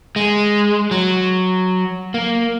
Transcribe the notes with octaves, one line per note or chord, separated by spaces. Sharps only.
G#3
F#3
A#3